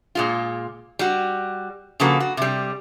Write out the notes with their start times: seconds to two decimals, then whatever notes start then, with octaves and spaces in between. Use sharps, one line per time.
0.15 A#2 G#3 F4
0.99 G3 F#4
2.00 C#3 F3 A#3 F#4 A4 B4
2.20 F#4
2.37 C3 G3